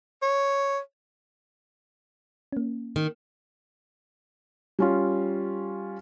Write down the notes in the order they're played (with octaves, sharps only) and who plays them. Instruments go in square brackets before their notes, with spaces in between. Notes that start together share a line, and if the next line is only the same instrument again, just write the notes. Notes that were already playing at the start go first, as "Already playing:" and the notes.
[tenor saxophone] C#5
[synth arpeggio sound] A#3 C#4
[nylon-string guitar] D#3
[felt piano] G3 C#4 F4